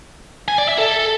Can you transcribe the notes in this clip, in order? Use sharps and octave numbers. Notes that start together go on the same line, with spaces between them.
G#5
D5
E5
A4